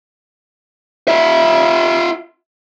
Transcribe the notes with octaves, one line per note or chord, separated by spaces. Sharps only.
F4 E5